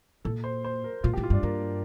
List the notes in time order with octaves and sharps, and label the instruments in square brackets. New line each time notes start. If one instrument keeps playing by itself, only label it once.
[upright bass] A#2 [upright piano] A4
[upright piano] C5
C5
A#4
[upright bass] A#2 [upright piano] F4
[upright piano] G4
[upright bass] A2
[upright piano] F4
[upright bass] G2 [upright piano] D4
[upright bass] G2 [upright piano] A#3